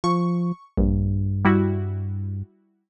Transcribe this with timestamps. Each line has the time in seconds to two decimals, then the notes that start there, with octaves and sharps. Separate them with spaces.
0.04 F3 C#6
0.77 A#1 G2
1.45 G3 E4 F#4